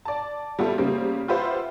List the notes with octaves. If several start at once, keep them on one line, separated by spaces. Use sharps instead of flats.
D5 A5
G3 B3 E4 F4 G4 A4
C#3 G3 A#3 C5
F4 G4 B4 C5 E5 F#5